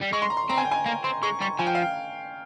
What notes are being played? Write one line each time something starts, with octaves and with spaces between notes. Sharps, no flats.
G3
G#3 C#6
C6
A#5
C6
C4 A#5
G#5
G5
G#5
A#3 A#5
C4 C6
G#3 C#6
G3 C#6
F3 G#5
G5
F5
G5